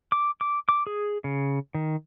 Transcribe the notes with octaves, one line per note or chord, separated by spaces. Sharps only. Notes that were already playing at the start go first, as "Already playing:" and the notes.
D6
D6
D6
G#4
C#3
D#3